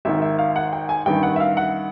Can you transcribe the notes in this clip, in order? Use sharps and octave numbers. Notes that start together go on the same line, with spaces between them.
G#1 G#2 D#3 E5
E5
F5
F#5
G5
G#5
A1 G2 D#3 G5
F#5
E5
F5
F#5